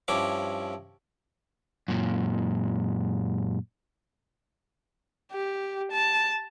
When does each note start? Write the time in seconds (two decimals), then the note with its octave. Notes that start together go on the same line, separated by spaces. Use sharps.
0.08 G2 F3 C#4 E4 D6
1.88 F#2 A#2
5.32 G4
5.92 A5